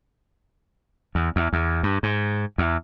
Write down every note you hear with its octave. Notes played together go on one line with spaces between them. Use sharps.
E2
E2
E2
G2
G#2
E2